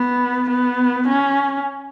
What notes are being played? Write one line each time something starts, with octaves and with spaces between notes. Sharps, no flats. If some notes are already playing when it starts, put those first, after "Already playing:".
Already playing: B3
B3
C#4